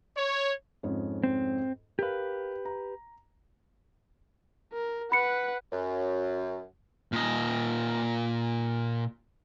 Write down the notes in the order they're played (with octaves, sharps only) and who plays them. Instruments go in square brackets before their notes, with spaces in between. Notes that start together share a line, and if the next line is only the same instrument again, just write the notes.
[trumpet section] C#5
[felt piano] F2 G#2 C#4
[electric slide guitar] C4
[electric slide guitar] G4 B4 [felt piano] A#4 F5
[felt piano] A#5
[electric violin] A#4
[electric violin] B4 F#5 [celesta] B5 C#7
[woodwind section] F#2
[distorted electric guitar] A#2 D#5